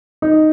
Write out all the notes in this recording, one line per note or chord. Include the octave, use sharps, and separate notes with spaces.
D#4